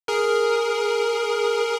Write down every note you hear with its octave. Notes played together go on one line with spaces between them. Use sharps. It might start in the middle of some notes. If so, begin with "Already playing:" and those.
G#4 A#4